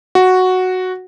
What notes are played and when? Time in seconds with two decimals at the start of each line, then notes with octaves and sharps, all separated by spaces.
0.15 F#4